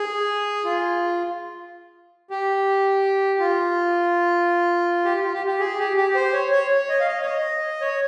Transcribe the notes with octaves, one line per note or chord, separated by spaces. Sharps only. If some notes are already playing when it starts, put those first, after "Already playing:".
Already playing: G#4
F4
G4
F4
G4
F4
G4
G4
G#4
G4
G4
C5
C#5
C#5
C#5
D#5
F5
D#5
C#5
D#5
C#5